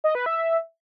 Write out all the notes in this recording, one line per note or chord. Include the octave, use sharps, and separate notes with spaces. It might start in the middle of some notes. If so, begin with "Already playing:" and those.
D#5
B4
E5